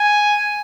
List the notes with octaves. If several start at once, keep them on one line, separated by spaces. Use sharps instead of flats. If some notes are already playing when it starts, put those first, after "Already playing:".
Already playing: G#5